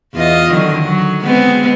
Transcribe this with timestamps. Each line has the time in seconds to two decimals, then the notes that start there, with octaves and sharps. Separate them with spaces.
0.14 E2 F4 D#5
0.52 D3 D#3 F#3
0.84 F#3
1.24 G#3 B3 C4